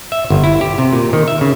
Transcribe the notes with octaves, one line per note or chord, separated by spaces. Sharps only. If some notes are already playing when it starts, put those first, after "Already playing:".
E5
G1
E4
G4
C3
A#2
D#3
E5
C#3